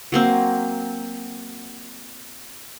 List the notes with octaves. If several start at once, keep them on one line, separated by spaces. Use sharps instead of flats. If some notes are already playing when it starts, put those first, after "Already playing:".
F#3 A#3 C4